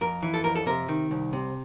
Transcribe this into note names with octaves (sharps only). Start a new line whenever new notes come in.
F2 A#4
E3
A4
F2 A#4
A4
C3 A#4
D#3
C2
C3